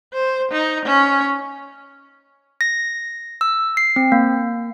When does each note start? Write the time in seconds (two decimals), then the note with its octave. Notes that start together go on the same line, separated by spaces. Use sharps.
0.13 C5
0.52 D#4
0.86 C#4
2.61 A#6
3.41 E6
3.77 C7
3.96 C4
4.12 A#3